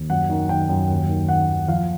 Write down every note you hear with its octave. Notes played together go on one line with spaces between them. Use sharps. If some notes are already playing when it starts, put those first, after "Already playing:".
Already playing: D#2
F#2 F#5
D#3
D#3 G5
F#2
D#2
D#3
D#3 F#5
D#2
F3 F5